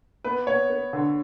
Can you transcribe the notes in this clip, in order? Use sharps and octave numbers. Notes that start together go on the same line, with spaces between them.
B3 B4
B3 C#5
B3
D3